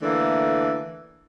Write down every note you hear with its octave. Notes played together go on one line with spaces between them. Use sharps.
D3 E3 A3 A#3